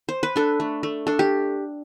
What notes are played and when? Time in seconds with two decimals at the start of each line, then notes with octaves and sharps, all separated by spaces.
0.09 C5
0.23 B4
0.36 D4 A4
0.60 A3
0.83 A3
1.07 D4 A4
1.19 G4